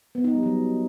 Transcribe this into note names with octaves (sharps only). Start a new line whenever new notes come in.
B3
D#4
G3
F#3